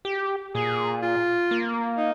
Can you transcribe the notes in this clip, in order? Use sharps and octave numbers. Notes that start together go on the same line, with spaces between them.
G4
A#2 G#4
F4
A#3
D#4